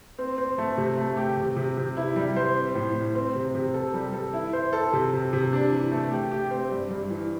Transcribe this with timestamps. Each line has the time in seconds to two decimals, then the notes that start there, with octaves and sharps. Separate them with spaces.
0.18 C4
0.38 C4
0.58 A3
0.78 C3
0.97 A3
1.17 G4
1.37 C3
1.56 C3
1.77 C3
1.97 E4
2.16 G3
2.36 C5
2.56 C4
2.75 A2
2.95 A2
3.15 C4
3.35 C3
3.55 C3
3.74 A4
3.94 G3
4.13 A4
4.33 E4
4.53 C5
4.73 A4
4.93 C3
5.13 C3
5.33 C3
5.53 D4
5.72 E3
5.91 A3
6.11 G4
6.31 G4
6.50 C4
6.71 G2
6.91 G2
7.10 E3